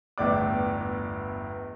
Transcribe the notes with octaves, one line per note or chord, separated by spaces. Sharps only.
G1 E2 A2 D5 D6